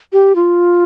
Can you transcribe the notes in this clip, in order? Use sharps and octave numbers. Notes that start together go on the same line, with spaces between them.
G4
F4